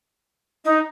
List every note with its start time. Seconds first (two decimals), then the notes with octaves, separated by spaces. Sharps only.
0.64 D#4